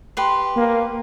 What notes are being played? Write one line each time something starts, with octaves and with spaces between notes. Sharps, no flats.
G4 B4 C6
A#3